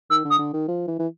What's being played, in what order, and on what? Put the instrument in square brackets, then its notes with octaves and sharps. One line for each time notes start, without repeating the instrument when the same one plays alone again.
[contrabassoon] D#3 [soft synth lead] E6
[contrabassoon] D3
[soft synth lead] D#6
[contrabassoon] D3
D#3
F3
E3
E3